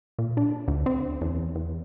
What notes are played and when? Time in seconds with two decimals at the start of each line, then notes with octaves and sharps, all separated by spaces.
0.19 A#2
0.37 D4
0.68 D2
0.86 C4
1.22 E2
1.55 E2